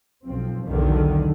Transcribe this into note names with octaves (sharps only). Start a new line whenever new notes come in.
B1 F3 C4
B1 E2 D3 D#3